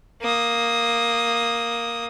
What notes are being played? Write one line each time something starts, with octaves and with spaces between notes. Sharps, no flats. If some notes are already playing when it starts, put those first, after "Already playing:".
A#3 D#6